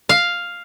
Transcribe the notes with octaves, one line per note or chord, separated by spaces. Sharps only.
F5